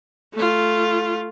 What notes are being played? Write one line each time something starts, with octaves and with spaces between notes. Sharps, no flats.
A3 F4